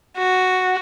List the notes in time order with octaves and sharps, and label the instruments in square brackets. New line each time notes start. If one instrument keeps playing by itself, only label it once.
[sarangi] F#4